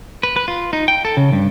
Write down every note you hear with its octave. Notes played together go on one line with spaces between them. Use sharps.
B4
B4
F4
D#4
G5
A4
C#3
G2